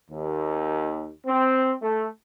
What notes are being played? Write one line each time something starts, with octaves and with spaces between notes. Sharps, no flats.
D#2
C4
A3